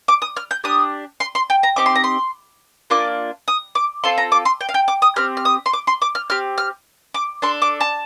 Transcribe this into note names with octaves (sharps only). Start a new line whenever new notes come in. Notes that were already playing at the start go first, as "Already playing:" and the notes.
D6
D#6
F6
G6
D4 G4 D#6
C6
C6
G5
A#5
C4 D#4 G4 D6
C6
A#5
C6
A#3 D4 F4 D6
D#6
D6
C4 F4 A4 C6
A#5
D6
C6
G5
F5
G5
D6
D#6
C4 G4 F6
F6
D#6
C6
D6
C6
D6
F6
C4 G4 F6
F6
D6
D4 A4 C6
D6
A5